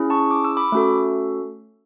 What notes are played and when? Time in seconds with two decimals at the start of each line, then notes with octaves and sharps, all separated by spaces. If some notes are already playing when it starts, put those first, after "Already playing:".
Already playing: C#4 E4 G#4
0.10 A5 C#6
0.31 D6
0.44 E6
0.57 B5 D6
0.72 A3 C#4 F#4 A4